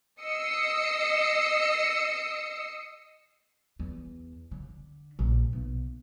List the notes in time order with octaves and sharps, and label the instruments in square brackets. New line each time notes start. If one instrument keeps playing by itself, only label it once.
[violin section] D#5 D#6 E6 C7 C#7
[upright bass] E2
D3
A#1
B1